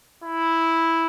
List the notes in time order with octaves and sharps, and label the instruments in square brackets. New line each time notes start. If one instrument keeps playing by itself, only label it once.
[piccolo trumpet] E4